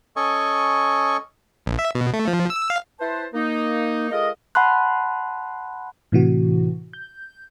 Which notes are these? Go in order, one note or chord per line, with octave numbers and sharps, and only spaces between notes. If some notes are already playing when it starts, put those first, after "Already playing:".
C#4 A4 D#5 G#5 C#6
A#1
E5
B2
A3
F3
E6
F5
E4 B4 C5 A5
A#3 D#4
G#3 F4 A4 A#4 D#5
F#5 A5 B5 C6 F#6
A2 C3 E3 F#4
G6